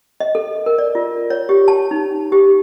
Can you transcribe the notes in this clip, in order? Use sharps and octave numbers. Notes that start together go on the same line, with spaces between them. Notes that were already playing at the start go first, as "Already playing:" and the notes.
D#5
A4
A#4
D5
F4
C#5
G4
A5
D#4
G4